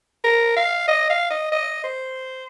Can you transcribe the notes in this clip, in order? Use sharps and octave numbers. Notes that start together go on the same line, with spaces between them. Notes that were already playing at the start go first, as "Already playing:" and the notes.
A#4
F5
D#5
F5
D#5
D#5
C5